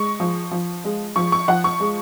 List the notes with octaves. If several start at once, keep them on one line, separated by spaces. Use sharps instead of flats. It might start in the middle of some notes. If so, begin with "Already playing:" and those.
Already playing: G#3 C#6
F3
F3
G#3
F3 C#6
C#6
F3 F#5
C#6
G#3